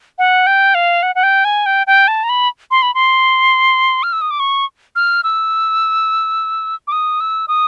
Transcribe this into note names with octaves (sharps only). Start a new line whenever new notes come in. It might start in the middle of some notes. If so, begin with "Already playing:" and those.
F#5
G5
F5
F#5
F#5
G5
G#5
G5
G5
A5
A#5
B5
C6
B5
C6
F6
E6
D#6
D6
C#6
F6
E6
D6
D#6
E6
D#6